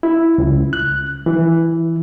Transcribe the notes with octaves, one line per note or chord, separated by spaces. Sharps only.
E4
C#2
F#6
E3